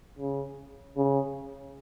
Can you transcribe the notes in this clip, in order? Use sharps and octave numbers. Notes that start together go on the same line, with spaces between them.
C#3
C#3